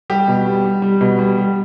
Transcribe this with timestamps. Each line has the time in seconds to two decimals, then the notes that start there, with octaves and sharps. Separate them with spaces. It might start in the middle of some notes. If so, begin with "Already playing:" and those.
0.10 G3 G4
0.28 B2
0.46 G3
0.64 G3
0.82 G3
1.01 B2
1.19 G3
1.37 G3